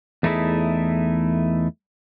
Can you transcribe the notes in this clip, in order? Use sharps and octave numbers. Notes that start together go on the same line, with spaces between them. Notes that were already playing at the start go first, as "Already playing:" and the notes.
E2 A3 D#4 E4 G#4 A4